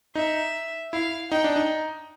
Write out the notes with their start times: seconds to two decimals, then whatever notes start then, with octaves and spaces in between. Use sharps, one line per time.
0.15 D#4 E5
0.93 E4 F5
1.31 D#4 G5
1.44 D4
1.56 D#4